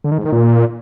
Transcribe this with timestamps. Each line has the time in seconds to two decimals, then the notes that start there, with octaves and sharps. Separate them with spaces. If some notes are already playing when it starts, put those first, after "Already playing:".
0.04 D3
0.11 D#3
0.18 G#2
0.25 D#3
0.32 A#2